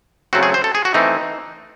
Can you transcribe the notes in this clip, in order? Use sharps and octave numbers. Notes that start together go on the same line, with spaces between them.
C#3 F#3 A3 C4 F#4
G#4
C5
A4
G#4
F#4
E3 A3 C4 D#4